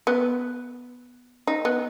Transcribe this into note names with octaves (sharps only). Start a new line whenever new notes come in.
B3
D#4
B3